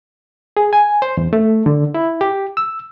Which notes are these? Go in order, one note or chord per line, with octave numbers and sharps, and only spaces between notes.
G#4
G#5
C5
E2
A3
D3
E4
G4
E6